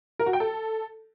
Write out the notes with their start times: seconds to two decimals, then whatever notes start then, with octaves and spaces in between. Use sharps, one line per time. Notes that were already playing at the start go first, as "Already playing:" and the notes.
0.19 A#4
0.26 F#4
0.33 G5
0.40 A4